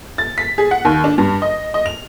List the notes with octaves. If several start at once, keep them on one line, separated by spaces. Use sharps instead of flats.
A6
B6
G#4
F#5
D#2
D4
G2
D#5
D#5
F7